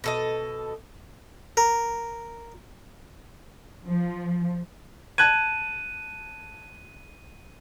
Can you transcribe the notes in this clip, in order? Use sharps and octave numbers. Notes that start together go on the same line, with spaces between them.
B2 A4 D#5
A#4
F3
A5 F#6 G#6 D#7